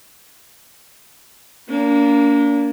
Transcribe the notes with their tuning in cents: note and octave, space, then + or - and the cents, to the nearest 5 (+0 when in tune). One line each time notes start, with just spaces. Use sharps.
A#3 +0 D4 -40